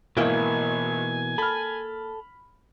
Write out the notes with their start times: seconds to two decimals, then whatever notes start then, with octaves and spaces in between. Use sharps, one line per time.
0.17 G#1 B2 E3 A#3 E4 G5 G#5
1.38 A4 B5 F6